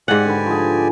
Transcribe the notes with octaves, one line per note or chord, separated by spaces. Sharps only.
G#2 G4 D5 F#5 G#5
D3 B4
F3 G#4